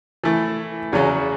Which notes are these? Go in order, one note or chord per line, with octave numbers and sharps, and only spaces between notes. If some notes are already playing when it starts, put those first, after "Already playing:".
E3 A3 E4
E2 C#3 F#3 C#4 F#4